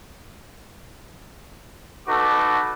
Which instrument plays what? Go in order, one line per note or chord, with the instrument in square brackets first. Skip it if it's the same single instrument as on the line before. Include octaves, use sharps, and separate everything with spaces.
[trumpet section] D#4 F#4 A4 B4 D6